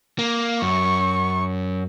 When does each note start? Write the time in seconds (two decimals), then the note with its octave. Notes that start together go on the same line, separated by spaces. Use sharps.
0.19 A#3
0.62 F#2 C#6